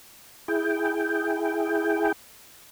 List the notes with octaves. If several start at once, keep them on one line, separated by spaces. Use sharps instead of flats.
E4 G#4 G5